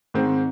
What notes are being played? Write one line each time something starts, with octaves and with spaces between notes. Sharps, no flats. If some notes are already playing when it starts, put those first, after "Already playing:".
G#2 D#3 G#3 C4